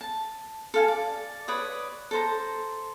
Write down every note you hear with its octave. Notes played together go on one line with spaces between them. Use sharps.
A5
A4 F5 G#5
D5
B4 C#5 D5 D#6
A4 C5 A#5